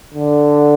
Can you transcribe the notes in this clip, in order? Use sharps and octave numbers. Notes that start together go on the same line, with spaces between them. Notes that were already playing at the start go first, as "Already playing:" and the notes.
D3